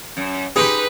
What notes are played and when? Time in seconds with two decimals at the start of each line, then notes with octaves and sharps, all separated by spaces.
0.17 F#2
0.56 D#4 G4 G#4 B4 C6